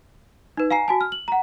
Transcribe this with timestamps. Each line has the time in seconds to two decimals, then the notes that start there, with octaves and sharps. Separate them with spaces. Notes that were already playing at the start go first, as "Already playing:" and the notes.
0.57 D#4 B4
0.70 F5 G#5 A#5 C7
0.88 F#4 G#5 A5
1.01 F6
1.12 F#7
1.28 F#5 A#5